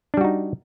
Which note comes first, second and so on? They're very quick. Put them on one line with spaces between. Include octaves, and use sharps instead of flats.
D4 G3 F#4 D#4